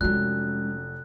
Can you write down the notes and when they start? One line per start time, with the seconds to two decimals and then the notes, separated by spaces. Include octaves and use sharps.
0.01 F1 F#3 G#3 C#4 F#6